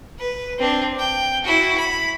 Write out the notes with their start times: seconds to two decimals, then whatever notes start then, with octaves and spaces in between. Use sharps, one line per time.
0.19 B4
0.59 C4 D4
0.99 G5
1.45 E4 F#4
1.78 B5